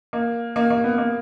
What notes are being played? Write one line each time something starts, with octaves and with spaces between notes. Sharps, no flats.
A#3
A#3
A#3
B3
A#3